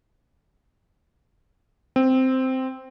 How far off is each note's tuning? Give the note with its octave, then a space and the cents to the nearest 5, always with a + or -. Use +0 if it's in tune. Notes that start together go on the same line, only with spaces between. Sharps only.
C4 -5